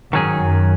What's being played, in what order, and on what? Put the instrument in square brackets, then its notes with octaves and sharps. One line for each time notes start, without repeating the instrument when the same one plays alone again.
[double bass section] G#2 [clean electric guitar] D#3 F#3 C#4 G#4
[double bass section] F#2